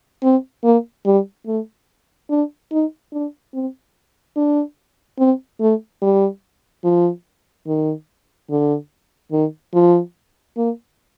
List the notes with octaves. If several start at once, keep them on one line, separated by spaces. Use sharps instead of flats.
C4
A#3
G3
A3
D4
D#4
D4
C4
D4
C4
A3
G3
F3
D#3
D3
D#3
F3
A#3